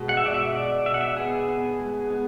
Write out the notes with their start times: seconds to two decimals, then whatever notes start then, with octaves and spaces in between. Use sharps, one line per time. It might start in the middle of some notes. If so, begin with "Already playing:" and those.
Already playing: B2 G#3
0.09 F#5
0.17 E5
0.24 B2 D5
0.34 E5
0.55 B2 D5
0.86 B2 E5
0.94 F#5
1.01 E5
1.17 B3 G#4
1.48 B3
1.79 G#3
2.10 B3